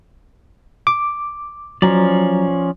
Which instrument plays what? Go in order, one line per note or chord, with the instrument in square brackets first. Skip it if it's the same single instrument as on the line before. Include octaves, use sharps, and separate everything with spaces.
[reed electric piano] D6
[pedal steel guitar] F3 C#4 D5 [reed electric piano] F#3 A#5